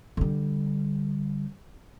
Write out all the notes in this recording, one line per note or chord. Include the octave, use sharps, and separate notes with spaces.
D3 G3